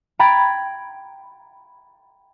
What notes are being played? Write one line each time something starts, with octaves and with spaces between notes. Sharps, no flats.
G5 A#5 B5 G#6 A6 D7